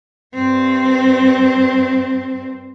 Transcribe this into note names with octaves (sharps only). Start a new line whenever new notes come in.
G2 C4